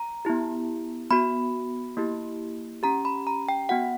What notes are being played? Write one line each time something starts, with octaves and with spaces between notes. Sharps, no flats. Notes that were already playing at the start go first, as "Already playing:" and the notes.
Already playing: A#5
B3 E4 G4
B3 F#4 B5
A#3 E4 G4
C#4 G4 A#5
B5
A#5
G5
B3 F#4 F#5